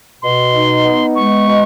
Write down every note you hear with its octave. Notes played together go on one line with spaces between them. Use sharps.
B2 C6
D#4
B3
G#3 C#6
B2